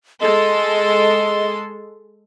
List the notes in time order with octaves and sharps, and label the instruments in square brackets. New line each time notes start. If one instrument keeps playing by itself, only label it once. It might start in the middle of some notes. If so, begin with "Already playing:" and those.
[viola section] G#3 A4 C6 [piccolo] D#5